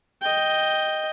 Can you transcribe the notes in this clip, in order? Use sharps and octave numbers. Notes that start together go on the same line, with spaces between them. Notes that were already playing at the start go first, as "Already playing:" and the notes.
D#5 G5